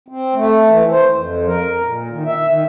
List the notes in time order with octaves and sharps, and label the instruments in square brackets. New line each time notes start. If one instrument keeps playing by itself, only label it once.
[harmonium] C4
A3
E3
C5
F2
A#4
A#2
D#3
E5
D#3